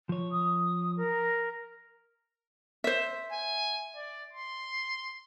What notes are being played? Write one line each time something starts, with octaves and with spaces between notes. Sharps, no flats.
F3 C#5
D#6
A#4
C5 E5
G#5
D5
C6